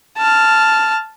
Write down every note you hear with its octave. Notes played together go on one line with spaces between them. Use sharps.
A5 F6